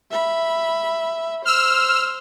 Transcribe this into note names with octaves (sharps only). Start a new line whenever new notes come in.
E5 B5
C5 E6 F6